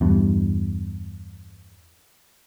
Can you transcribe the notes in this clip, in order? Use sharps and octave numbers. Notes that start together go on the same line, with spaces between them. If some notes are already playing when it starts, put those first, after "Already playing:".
E2 G2